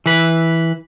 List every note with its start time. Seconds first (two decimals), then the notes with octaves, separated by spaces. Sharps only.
0.06 E3 B4